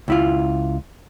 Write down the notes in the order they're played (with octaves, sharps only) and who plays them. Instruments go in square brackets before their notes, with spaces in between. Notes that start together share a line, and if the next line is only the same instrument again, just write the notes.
[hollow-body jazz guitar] C#2 E4 F4